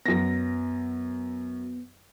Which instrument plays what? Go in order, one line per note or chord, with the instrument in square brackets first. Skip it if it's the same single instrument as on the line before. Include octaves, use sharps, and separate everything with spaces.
[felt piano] F#2 A#6 [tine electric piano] B3